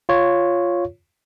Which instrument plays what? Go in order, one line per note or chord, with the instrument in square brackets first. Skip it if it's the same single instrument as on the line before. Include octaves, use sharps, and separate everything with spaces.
[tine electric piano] F4 C#5